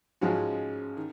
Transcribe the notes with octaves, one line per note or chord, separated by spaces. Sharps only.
G#2 F3 G#3 C#4 F#4
D#3